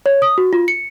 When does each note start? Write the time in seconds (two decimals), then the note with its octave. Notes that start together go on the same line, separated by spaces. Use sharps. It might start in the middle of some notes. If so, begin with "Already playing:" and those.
0.06 C#5
0.22 D#6
0.38 F#4
0.53 F4
0.68 C#7